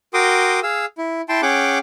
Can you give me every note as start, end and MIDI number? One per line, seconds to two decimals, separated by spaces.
0.14 0.60 66
0.14 0.60 70
0.14 0.60 79
0.14 0.60 84
0.14 0.60 86
0.14 0.60 87
0.63 0.85 68
0.63 0.85 77
0.63 0.85 88
0.98 1.21 64
1.29 1.41 64
1.29 1.41 79
1.29 1.41 81
1.29 1.41 84
1.42 1.78 61
1.42 1.78 68
1.42 1.78 78
1.42 1.78 79
1.42 1.78 86